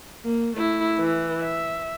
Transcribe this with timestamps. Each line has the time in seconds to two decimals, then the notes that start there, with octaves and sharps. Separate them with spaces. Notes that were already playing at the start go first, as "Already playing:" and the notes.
0.24 A#3
0.57 A3 E4
0.99 E3
1.40 E5